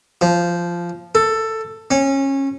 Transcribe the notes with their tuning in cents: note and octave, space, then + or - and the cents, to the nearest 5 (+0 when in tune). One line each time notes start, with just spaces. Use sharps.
F3 -10
A4 +10
C#4 -20